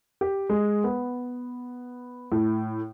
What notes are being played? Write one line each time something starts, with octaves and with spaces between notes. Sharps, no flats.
G4
G#3
B3
A2